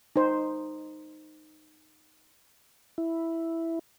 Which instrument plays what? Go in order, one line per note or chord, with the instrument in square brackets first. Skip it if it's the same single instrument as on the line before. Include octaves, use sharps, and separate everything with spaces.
[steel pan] D#4 C5
[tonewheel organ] E4